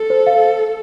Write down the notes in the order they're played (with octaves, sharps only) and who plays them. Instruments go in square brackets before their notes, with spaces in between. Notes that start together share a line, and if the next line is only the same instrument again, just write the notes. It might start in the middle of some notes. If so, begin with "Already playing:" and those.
Already playing: [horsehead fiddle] A4
[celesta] C5
F5